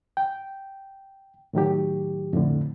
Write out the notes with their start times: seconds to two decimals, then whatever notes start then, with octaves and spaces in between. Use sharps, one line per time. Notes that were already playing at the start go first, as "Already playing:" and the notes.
0.17 G5
1.53 A2 D#3 F#3 G4
2.33 F2 A2 D3